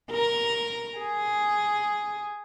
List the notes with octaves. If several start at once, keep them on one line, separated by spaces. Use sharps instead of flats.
A#4
G#4